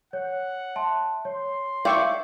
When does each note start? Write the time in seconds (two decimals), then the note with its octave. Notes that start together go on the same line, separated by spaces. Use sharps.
0.13 C#5 F#5
0.76 E5 A5 C6
1.25 C#5 C6
1.85 D5 E5 F5 G5 C#6